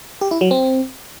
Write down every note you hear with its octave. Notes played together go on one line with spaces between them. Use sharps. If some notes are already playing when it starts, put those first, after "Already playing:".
G4
E4
F#3
C4